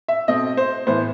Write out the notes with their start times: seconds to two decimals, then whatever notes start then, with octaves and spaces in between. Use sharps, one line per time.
0.08 E5
0.28 B2 A3 C4 D#5
0.57 C5
0.87 A2 E3 B3 C5